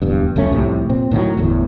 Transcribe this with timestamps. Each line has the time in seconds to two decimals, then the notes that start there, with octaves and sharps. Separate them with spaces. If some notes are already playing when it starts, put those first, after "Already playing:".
0.02 D1 E2 G2
0.36 C#2 F#2 A3 C#4
0.52 C2 F2 A2 C3
0.89 A#2 C4
1.11 A2 D#3 F3 F#3
1.37 G1 E2 A2